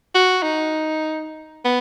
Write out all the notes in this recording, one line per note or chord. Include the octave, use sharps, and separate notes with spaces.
F#4
D#4
B3